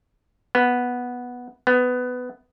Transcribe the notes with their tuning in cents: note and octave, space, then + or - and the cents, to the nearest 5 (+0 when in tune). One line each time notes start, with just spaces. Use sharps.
B3 -5
B3 +15